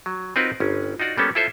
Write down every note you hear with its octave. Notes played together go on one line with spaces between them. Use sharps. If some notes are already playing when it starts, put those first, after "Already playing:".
F#3
C4 D#4 F4 F#4 A#4 B4
G1 C#4
D#4 F4 F#4 D5
G3 A#3 B3 C#4 A4
E4 F4 A4 C5 E5